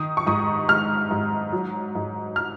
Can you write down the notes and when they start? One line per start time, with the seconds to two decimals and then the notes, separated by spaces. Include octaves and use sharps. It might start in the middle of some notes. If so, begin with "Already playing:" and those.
Already playing: D#3 D#6
0.17 C#6
0.27 G#2 D#6
0.69 G#3 F6
1.11 G#2
1.52 F#3
1.95 G#2
2.36 F6